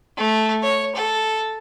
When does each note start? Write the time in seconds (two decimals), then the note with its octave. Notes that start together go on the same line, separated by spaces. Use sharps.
0.17 A3
0.63 C#5
0.95 A4